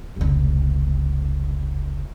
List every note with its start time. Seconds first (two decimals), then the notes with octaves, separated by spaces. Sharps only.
0.16 F1 C#2